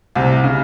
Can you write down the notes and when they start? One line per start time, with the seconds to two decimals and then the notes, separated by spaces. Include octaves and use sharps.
0.16 C2 C3
0.44 C#3